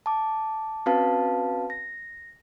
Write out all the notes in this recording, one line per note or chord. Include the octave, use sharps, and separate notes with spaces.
A5 D6
C4 C#4 F#4 B4 F5 A5
A#6